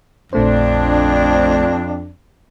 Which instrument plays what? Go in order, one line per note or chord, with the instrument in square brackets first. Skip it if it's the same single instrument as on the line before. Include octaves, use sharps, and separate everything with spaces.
[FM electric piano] A#1 A3 C5 [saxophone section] F2 D4